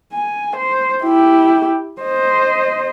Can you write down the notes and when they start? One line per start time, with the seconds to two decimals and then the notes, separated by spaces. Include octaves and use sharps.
0.13 G#5
0.56 C5
1.03 E4 G4
2.02 C5 D#5